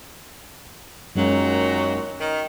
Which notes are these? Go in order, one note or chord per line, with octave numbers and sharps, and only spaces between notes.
F#2 A#2 D#3 F#3 G#3 C#4
D#3